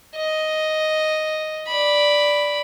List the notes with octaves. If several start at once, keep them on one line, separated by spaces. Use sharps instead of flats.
D#5
D5 B5